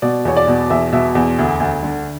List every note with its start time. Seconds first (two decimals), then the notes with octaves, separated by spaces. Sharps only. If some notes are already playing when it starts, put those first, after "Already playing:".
0.02 B2 D5
0.25 E2 C#5
0.37 D5
0.48 B2
0.70 E2 E5
0.93 B2 E5
1.15 E2
1.39 D2
1.60 D2
1.83 D3